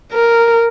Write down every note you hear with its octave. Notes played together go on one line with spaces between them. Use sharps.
A#4